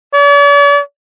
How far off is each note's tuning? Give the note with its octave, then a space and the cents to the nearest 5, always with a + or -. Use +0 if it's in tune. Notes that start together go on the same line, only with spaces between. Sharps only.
D5 -45